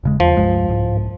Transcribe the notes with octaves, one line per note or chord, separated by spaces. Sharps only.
E1 C#3 G#3
E2 F3
C#2 G2 G#3
C2 G#2